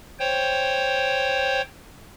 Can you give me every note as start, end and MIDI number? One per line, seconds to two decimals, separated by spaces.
0.19 1.61 72
0.19 1.61 73
0.19 1.61 79